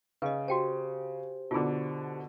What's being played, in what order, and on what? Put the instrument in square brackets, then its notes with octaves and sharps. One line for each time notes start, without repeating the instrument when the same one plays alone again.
[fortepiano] C#3 [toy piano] B4 D#5
[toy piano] F#4 G5 A5 [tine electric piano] G4 C5
[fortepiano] B2 D3 [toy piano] F4 G#4